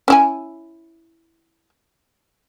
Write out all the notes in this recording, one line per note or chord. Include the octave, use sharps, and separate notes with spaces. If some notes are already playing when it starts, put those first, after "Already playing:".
C#4 E4 G#5